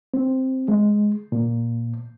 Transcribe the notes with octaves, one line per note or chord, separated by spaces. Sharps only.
C4
G#3
A#2